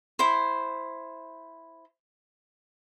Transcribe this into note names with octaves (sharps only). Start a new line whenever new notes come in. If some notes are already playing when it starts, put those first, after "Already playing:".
E4 C5